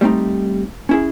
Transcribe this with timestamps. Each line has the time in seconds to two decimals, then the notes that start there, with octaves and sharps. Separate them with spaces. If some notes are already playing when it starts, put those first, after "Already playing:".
0.01 G3 A3 C4 D4 D#4
0.89 C#4 E4 G#4